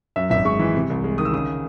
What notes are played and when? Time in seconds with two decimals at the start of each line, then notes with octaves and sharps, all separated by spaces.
0.16 F#2 E5
0.30 G#1 E5
0.45 G#3 C#6
0.59 E3
0.75 C3
0.90 C2
1.04 G#3
1.18 D#3 D#6
1.25 E6
1.33 C#3 D#6